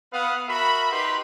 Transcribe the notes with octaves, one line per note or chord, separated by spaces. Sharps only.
B3 B4 F5 F#5 D#6
F#4 A#4 E5 B5
D#4 G4 B4 B5 C6